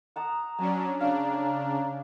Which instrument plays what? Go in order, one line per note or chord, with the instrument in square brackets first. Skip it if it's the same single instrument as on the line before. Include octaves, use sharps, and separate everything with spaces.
[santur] F#5 A5 D#6 [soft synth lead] A#5
[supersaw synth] F#3 C#4 D4 [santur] A5
[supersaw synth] C#3 D4 [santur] F5
[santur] G#5